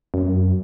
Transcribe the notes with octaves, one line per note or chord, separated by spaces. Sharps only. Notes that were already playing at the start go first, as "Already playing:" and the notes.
F#2